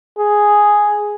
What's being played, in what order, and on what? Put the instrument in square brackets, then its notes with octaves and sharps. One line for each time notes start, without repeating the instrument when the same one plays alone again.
[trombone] G#4